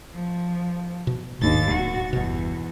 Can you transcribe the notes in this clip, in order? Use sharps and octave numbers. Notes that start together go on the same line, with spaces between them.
F3
B2
D1 D#2 G#2 D4 A6
D1 F#4
G1 E2 B2